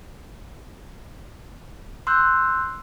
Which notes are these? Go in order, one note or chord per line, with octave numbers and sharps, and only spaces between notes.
C6 E6 F#6 G6